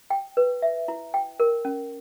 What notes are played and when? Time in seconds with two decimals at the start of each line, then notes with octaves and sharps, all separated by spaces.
0.10 G5
0.37 B4
0.62 E5
0.88 E4
1.14 G5
1.40 A#4
1.65 C#4